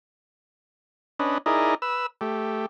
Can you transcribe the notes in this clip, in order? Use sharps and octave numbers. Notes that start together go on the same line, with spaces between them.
C#4 D4 B4 D#5
D#4 E4 G#4 A#4 D5 D#5
B4 E6
A3 G4